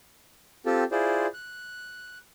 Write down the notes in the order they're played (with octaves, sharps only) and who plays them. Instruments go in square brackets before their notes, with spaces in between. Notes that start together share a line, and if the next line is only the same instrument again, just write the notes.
[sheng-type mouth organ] C4 F4 G4 A4
E4 F4 G#4 C5 D5
F#6